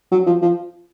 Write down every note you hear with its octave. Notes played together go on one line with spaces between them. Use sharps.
F#3
F3
F3